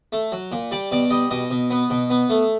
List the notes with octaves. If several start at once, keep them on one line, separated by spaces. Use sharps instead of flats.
A3
F#3
A#2
G3 D5
B2 D5
G3 D#5
B2 D#5
B2
B3
B2
B3
A3